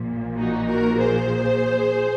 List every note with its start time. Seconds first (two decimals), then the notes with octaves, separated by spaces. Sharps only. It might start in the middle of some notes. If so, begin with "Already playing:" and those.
Already playing: A#1 A#2 F3
0.37 D#4 F#4
0.68 F#4 A#4
0.98 G#4 C5